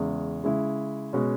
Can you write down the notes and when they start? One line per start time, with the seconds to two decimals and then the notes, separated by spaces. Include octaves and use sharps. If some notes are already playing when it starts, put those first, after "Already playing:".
Already playing: E2 C#3 G#3
0.44 C#3 G#3 E4
1.13 B2 G#3 C#4